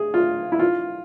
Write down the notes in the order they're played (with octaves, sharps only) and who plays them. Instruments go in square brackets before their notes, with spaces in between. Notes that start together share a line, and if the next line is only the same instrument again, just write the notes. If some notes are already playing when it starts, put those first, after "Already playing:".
Already playing: [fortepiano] G#4
F4
E4
F4